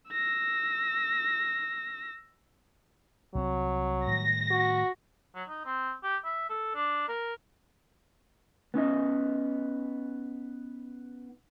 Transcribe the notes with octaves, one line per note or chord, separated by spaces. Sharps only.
E6 A#6
C2 F#3 C4
A2 D#3 G3 A#6
F#4
F#3
D#4
C4
G4
E5
A4
D4
A#4
B3 C#4 D#4 D#5